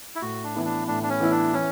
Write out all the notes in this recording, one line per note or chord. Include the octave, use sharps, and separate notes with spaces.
E4
A2 F#4
D4
E3 B3 E4
D4
A2 D4
D4
C#4
E3 B3 E4
D4
E3 C#4